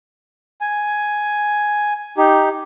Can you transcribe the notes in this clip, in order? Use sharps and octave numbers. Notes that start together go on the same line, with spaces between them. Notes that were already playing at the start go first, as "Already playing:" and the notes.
G#5
D#4 G4